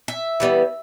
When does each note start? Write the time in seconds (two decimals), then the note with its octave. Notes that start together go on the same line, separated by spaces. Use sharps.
0.08 E5
0.40 E3 G3 B3